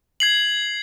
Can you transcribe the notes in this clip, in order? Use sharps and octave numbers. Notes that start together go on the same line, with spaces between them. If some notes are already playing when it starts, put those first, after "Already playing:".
G#6 C7 F#7